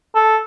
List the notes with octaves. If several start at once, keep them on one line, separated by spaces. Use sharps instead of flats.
A4